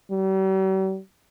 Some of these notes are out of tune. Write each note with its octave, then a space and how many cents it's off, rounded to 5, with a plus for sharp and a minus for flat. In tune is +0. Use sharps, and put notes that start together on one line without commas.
G3 -45